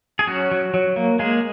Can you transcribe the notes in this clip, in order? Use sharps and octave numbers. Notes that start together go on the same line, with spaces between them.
G#4
F#3 C#4 F#4
F#3
F#3
A#3
G#3 A#3 G#4